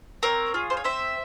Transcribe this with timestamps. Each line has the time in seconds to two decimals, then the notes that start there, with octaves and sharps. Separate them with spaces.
0.23 C4 A#4 C#5
0.54 F4 G#4
0.70 C5
0.77 C#5
0.84 C4 C5 E5